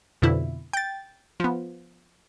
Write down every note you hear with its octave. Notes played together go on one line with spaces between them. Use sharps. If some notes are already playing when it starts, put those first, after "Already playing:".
F2 B2 D3 E4
G5 A6
F3 B3